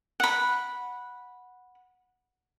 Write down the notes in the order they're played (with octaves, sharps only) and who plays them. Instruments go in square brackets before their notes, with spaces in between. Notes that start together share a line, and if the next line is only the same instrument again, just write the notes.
[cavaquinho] F#5 B5